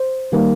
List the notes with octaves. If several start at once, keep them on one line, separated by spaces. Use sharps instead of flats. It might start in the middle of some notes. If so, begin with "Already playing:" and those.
Already playing: C5
D#3 G3 A#3